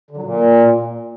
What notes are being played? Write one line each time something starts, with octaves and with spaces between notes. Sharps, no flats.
D3
F#3
A#2